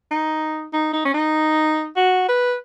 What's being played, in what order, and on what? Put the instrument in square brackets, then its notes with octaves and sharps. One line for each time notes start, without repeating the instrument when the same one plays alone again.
[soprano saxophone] D#4
D#4
D#4
C#4
D#4
F#4
B4